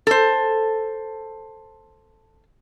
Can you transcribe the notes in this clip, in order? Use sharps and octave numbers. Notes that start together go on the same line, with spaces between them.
A4 C5